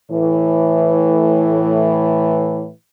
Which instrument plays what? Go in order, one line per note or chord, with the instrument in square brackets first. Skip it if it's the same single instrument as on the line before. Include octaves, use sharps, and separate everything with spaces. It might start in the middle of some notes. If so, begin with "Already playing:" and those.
[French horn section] A2 E3